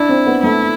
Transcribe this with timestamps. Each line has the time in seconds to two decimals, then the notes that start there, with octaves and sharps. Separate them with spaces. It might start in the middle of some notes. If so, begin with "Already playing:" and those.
Already playing: D4 E4
0.09 C4
0.26 B3
0.43 A3 E4